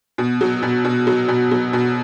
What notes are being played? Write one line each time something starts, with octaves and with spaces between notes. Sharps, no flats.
B2
F#3
B2
B2
F#3
B2
F#3
B2